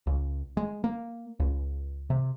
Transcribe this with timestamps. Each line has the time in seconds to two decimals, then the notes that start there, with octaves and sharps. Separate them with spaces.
0.07 C#2
0.57 G#3
0.84 A#3
1.40 C#2
2.10 C3